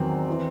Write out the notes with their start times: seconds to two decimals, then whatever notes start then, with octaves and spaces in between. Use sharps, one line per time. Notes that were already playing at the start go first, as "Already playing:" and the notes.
Already playing: E2 D#3 F#3 C4
0.30 E3